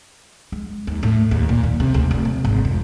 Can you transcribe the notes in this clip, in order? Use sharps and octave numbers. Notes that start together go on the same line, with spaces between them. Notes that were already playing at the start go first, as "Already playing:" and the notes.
G#3
D#2
A2
D#2
A#2
D#3
C3
D2
F1
C3
G#1
F2